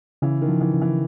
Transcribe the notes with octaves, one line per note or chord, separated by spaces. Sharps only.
C#3 E3
D#3
F3
E3
C#3
E3